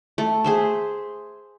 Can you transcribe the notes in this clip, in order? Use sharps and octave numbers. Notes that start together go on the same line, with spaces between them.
A3
G#4 C5 E5